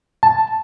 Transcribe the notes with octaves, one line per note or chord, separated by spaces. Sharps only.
A5